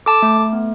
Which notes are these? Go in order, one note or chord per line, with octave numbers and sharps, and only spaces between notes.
A4 A5 D6
A3
A3
B3